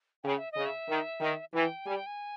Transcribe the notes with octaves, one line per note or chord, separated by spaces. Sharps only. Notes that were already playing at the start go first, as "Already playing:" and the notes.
C#3 G5
E5
C#3 D#5
E5
D#3
D#3
E3 G5
G3 G#5
G5
G#5